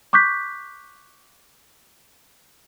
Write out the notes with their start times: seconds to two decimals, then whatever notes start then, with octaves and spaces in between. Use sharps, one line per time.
0.13 C#6 D6 F#6 G6 B6